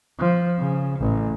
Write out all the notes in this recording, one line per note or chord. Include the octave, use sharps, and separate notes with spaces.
F3
C#3
A1